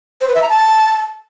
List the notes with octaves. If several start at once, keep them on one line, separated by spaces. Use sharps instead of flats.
C5
B4
E5
A#5
A5